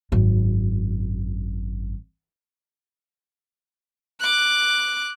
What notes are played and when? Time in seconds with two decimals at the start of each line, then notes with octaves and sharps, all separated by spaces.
0.12 G#1 F#2
4.20 D6 F#6